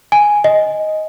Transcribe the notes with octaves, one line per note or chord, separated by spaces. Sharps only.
G#5
D#5